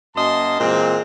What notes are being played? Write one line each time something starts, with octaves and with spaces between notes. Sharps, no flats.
F#2 A#3 D#5 A5 C6
A#2 E3 G#3 C4